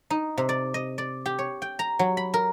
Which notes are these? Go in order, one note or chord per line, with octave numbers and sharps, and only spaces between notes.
D#4
C3
D5
D#5
D5
G4
C#5
G5
A#5
F#3
B5
A#4